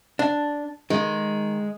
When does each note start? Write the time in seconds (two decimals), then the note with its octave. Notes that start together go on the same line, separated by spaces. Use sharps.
0.19 D4
0.90 D#3 G#3